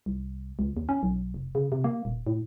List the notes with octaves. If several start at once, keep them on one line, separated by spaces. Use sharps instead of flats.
C2
C#2
D#2
C#4
B1
F1
C#3
C3
A#3
D#1
A2